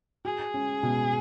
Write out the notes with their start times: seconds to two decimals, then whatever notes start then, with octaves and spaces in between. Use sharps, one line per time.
0.25 F#4 G#4
0.54 C#4
0.83 B2